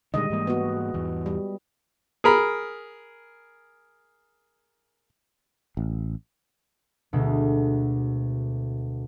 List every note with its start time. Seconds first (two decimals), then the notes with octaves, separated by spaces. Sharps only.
0.14 A#2 D3 D#3 G3 G#3 D#5
0.30 G#2 E3 A#3
0.47 B3 F#4
0.94 E2 G#2 E3
1.26 G3
2.24 G#4 A#4 B5
5.77 A1
7.13 D2 B2 G#3 A3